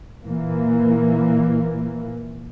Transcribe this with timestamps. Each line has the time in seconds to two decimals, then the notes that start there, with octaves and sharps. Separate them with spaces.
0.23 A#2 E3 A#3